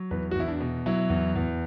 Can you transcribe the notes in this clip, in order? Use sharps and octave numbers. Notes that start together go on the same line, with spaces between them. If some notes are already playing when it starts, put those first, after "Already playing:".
Already playing: F#3
E2 B4
F#4
E2 E4
D4
B2
F#3 E4
E2
E2